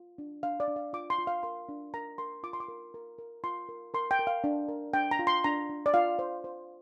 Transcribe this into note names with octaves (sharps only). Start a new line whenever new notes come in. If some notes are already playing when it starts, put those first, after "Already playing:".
Already playing: F4
D4
D4 F5
D5
D4
F5
F4 D6
C6
F4
F5
A#4 C6
D4
A#4 A#5
A#4 C6
F4 D6
C6
D6
A#4
A#4
A#4
F4 C6
A#4
A#4 C6
G5
A#4
F5
D4
A#4
D4 G5
A#5
F4
C6
D4 A#5
D4
D5
F4 F5
C5
C5